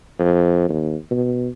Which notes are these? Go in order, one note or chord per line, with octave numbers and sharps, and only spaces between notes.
F2
D#2
B2